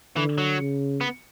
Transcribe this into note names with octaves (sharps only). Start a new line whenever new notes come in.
D3 E3
F#3
C#3
B3